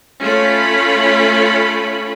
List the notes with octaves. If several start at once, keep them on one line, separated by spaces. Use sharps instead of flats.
A3 C#4 F4 C#5 B5